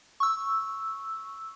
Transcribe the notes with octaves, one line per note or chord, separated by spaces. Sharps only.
C#6 E6